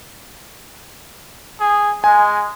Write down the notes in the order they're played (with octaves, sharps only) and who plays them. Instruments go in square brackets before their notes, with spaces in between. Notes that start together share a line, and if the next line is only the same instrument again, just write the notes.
[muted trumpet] G#4
[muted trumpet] G#3 [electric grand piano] G#5